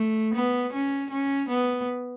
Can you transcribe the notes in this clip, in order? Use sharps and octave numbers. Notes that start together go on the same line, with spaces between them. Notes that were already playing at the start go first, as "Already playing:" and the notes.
Already playing: A3
B3
C#4
C#4
B3